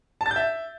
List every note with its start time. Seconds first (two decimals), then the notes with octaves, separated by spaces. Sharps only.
0.21 A5
0.26 A6
0.31 G6
0.36 E5